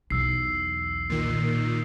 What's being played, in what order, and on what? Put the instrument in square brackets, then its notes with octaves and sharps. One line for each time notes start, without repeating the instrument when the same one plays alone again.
[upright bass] B1 E2 [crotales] E6 C7
[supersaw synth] A#2 D#3